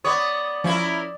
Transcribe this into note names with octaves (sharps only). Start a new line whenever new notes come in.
B3 C#5 D5 D#6
F3 C#4 E4 F4 A#4 G#6